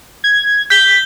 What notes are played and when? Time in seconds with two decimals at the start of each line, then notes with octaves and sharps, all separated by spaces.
0.24 G#6
0.70 G6 B6 G7